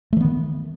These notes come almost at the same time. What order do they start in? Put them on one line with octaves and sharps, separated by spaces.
A3 E3 B3 D#3